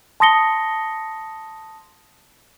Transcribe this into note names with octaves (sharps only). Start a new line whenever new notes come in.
A5 C6 D#6 A#6 C#7 G7